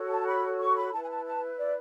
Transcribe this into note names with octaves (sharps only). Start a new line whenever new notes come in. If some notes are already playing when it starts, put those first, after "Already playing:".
Already playing: F#4 A4 C#5
A5
B5
C#6
B5
E4 B4 A5
G#5
A5
A5
D5